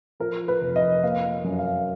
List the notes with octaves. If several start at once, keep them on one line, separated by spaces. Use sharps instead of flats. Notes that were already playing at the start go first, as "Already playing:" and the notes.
F3 A#4
B4
F1
D#5
A#3 F5
F#2
F5